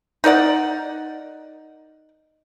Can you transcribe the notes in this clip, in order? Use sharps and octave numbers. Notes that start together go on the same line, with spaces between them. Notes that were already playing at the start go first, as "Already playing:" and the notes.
D#4 A#4 D5 F#5